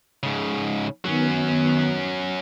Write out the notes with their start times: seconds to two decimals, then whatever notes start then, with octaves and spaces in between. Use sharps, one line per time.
0.23 G#2 C#3
1.05 D#3 F#3 B3 C#4